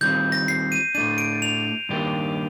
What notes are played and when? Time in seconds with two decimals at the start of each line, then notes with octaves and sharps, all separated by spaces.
0.01 D#3 G3 C4 F4 G6
0.32 A#6
0.48 C7
0.72 D#7
0.95 A2 A3 D4 D#7
1.18 D7
1.42 F7
1.89 G2 D#3 A#3 D4 G4